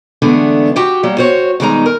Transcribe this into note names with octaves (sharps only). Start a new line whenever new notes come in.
D3 E3 G#3 A3 B3 D4
F#4 G4 G5
F#3 G3 A#3
F#4 C5 C#5
B2 D#3 G3 G#3 D#4 A#5
A#4